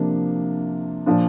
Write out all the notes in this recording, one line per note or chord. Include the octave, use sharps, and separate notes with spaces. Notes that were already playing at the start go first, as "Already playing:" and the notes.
Already playing: C3 F3 A#3 D4
A#2 F3 D4